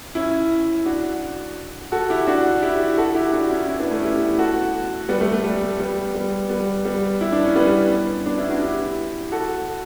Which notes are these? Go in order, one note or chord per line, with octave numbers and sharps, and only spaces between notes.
C#4 E4
D4 F#4
F#4 A4
E4 G4
D4 F#4
E4 G4
F#4 A4
E4 G4
D4 F#4
C#4 E4
C#4 E4
B3 D4
A3 C#4
E4 G4
F#4 A4
G3 B3
A3
A3
G3
A3
G3 B3
G3 B3
G3 B3
G3 B3
E4
D4
C#4
G3 B3
B3 D4
C#4 E4
D4 F#4
E4 G4
F#4 A4